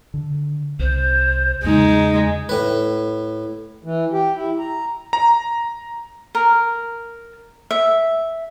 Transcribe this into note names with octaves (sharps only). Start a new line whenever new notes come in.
D3
C2 C5
E2 C#3 G#3 D#4
A2 B4
E3
G4
E4
A#5
A#5
A#4
E5